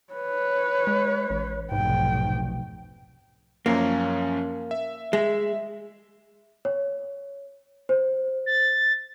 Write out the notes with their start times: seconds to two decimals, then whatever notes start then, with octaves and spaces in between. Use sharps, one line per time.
0.13 B4 C#5
0.87 G#3
1.30 A1
1.72 F1 B1 G#2 G5
3.66 F#2 F3 A#3 C#4
4.71 E5
5.13 G#3 E5
6.65 C#5
7.89 C5
8.46 A6